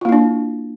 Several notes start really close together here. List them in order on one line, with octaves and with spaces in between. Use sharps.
F4 A#3 E4 D4